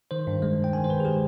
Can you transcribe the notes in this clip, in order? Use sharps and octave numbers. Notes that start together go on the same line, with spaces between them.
D#3 C5
G2
G#3
G2
G5
D#3 G#5
C5
G2 B4
G#4
G#3 G4